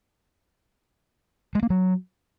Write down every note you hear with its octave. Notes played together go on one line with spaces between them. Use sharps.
G#3
A#3
F#3